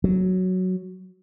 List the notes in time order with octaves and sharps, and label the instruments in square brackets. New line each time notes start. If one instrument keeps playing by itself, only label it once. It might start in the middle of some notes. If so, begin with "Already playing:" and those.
[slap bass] F#3